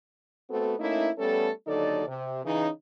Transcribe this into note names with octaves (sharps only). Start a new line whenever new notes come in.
A3 B3 C4 F#4 A4
A3 A#3 C#4 D#4 E4
G3 A3 B3 C#4 A4
D#2 D3 F#3 D#4 A4 D5
C3
C#3 E3 D#4